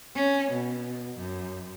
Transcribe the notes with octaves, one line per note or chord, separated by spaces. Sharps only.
C#4
B2
F#2